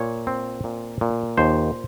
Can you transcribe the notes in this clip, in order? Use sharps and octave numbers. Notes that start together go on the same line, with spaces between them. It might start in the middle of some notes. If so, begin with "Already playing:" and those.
Already playing: A#2 C#5
C4
A#2
A#2
D#2 C5